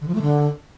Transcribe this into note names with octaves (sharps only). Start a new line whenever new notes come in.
D3
F3
A3
D3